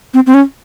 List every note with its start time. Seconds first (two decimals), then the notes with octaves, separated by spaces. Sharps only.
0.14 C4
0.26 C4
0.34 C#4